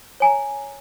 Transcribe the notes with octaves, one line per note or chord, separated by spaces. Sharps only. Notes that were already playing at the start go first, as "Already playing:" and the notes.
C#5 G#5 A#5